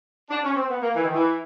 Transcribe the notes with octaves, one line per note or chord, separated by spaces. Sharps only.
D4
C#4
C4
B3
A#3
E3
D#3
E3